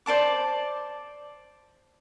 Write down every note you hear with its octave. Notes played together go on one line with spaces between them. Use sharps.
C5 D5 A5 D6